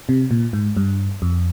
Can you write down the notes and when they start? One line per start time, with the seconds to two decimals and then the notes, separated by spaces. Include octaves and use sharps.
0.09 C3
0.31 A#2
0.53 G#2
0.77 G2
1.22 F2